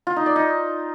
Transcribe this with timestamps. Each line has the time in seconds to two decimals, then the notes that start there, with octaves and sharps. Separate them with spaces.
0.07 F4
0.16 D#4
0.26 D5
0.36 D#4